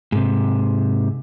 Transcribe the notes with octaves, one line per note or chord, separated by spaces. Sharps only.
G#2 C3